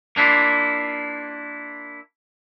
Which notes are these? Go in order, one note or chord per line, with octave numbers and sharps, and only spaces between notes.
A#3 D4 E4 F4